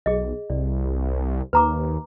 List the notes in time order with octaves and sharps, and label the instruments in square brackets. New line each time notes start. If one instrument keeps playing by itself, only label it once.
[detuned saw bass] B1 [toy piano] G#4 D#5
[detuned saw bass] C2 [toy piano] D5
[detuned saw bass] D#2 [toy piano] B4 A#5 D6